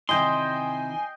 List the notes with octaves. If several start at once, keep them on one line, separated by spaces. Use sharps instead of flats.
C3 D#3 E4 D#5 G5 G#5 C6